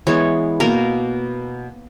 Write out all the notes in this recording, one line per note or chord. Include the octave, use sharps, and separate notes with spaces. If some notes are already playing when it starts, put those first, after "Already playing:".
E3 G#3 B3 C#5
B2 A#3 A#4